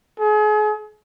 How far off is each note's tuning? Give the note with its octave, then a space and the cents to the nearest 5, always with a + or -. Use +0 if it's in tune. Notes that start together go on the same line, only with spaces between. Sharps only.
G#4 +35